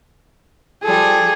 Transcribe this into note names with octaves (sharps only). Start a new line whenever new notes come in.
F3 G3 G#4 A4